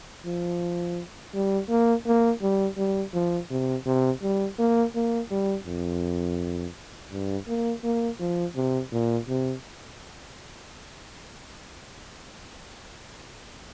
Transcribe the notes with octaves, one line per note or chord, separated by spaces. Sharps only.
F3
G3
A#3
A#3
G3
G3
F3
C3
C3
G3
A#3
A#3
G3
F2
G2
A#3
A#3
F3
C3
A#2
C3